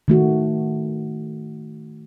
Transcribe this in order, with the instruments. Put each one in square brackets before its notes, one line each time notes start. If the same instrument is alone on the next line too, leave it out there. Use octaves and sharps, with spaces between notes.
[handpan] D#3 A3 F#4